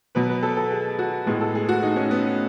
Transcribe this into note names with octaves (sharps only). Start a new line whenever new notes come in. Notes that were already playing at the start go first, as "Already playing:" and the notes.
B2 F#3 B3 B4
B4
A4
A4
G#4
F#4
A2 G#3 B3 G#4
A4
G#4
F#4
D#4
C#4
B3